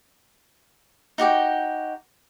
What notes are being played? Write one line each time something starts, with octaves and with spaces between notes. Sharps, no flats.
D#4 F#4 G4 G5